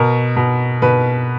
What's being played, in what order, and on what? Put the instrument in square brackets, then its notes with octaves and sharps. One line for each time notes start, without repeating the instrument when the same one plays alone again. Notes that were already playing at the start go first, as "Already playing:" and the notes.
Already playing: [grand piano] B2 A#4
B2
B2 B4